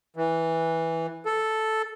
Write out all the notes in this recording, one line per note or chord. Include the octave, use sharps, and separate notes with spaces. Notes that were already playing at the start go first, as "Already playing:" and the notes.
E3
A4